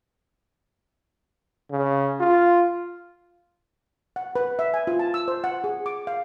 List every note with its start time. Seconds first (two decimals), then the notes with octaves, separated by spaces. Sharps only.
1.71 C#3
2.20 F4
4.16 F#5
4.36 B4
4.59 E5
4.74 G#5
4.87 F4
4.99 A5
5.14 E6
5.28 C5
5.44 F#5
5.64 G#4
5.86 D6
6.07 F5